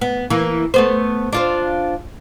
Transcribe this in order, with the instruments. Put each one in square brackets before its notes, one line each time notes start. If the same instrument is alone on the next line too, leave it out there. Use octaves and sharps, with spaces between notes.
[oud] B3
E3 A#3
A3 B3 C5
D4 F4 C5